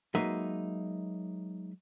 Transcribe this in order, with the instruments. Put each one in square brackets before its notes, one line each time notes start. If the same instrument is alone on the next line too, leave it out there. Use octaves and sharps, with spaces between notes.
[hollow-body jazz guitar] F#3 G#3 A#3 D#4 B4 E5